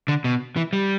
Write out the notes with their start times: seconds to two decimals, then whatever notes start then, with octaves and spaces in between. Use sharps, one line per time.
0.08 D3
0.24 B2
0.56 E3
0.73 G3